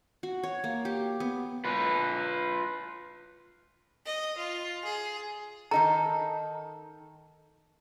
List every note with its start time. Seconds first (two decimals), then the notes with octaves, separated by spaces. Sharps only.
0.23 F#4
0.43 C#5
0.64 A#3
0.85 G4
1.20 B3
1.64 F4 B4
4.06 D#5
4.37 F4
4.85 G#4
5.71 D#3 D#4 A4 A#5